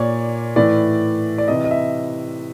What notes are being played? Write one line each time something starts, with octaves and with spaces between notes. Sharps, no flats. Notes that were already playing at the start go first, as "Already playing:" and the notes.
Already playing: A#2 C#5 D5
A2 E3 D5
D5
C3 E3 D#5
D#5
E5